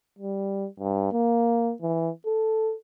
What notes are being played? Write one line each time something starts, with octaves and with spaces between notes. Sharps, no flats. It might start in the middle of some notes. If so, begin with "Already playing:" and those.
G3
G2
A#3
E3
A4